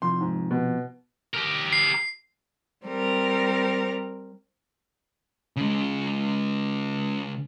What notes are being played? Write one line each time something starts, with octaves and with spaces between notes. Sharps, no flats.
C3 F3 C6
G#2
B2
G4 A#4
C7
G3 C4 A#4
C#3 G#3